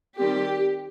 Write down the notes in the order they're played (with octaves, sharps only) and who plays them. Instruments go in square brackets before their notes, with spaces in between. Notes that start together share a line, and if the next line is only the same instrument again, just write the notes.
[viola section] D#3 G3 C4 G4